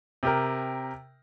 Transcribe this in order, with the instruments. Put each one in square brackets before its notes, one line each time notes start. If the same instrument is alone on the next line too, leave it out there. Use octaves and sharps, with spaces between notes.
[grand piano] C3 G4 A#4